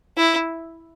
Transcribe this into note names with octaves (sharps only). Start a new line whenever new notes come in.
E4